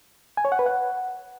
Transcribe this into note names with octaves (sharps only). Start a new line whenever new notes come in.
G#5
C#5
F#5
B4
F#5